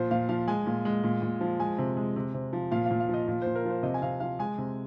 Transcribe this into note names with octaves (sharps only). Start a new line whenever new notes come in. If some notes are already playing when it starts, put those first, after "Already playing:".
Already playing: A#2 F3 C5
A#2 F5
F3 F5
G#3 G#5
A#2
G#3
A#2
A#2
F3
G#3 G#5
C3
G#3
C3
C3
F3
A#2 F5
F5
A#2
F5
F3
D#5
A#2
A#2 C5
A#4
F3 C5
C3 D#5
G#5
C3 F5
F3 F5
G#3 G#5
C3